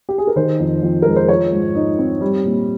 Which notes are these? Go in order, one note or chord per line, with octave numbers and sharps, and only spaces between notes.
G4
G#4
A#4
D#3 C5
F2
F2
G#3 A#4
C5
F3 C#5
G#2
D#4
C4
G3
A#2